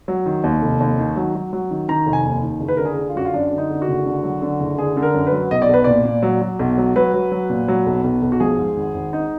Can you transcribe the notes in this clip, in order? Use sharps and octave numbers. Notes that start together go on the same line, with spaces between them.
F#3
D#3
D#2
F1
D#2
D#3
F#3
F#3
F#3
D#3
D#3 A#5
F1
G#5
D#2
D#3
F#1
B4
D3 A#4
G#4
D3
F4
F#2 F#4
F4
F#2 D4
D3
D#4
D3
F#4
F#1
D3
F#3
D3
F#1
D3 G#4
D3
A#4
F#2
B4
F#3
B1 D#5
D5
B1 B4
A#2 D5
A#2
F#3
F#3
B1
F#3
F#3 B4
F#3
F#3
A#2
F#3
B1
B1
B1
F#4
F3 G#4
G#2
G#1
G#1
G#3 D#4